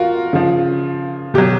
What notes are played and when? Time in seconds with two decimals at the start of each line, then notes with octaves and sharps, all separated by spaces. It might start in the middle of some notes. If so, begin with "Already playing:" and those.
Already playing: F4 F#4 A#4
0.33 C#3 F3
1.34 B2 F#3 G4